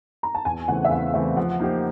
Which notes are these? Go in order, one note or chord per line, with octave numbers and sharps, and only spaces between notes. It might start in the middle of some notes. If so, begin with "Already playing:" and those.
A#5
A5
E2 G#5
C#3 E3 A3 C4 F#5
E5
E2 F5
C#3 E3 A3 C4 E5
F3 F#5
A#3 D#4 G4 C5